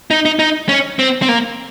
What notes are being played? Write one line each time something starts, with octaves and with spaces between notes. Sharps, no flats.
D#4
D#4
D#4
C#4
C4
C4
A#3